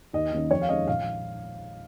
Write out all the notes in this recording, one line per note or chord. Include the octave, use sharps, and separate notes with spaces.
D#2 D#5
D#3 A#3 C#4
F2 C#5
F5
D#3 G#3 C#4 D#5
A#1 F5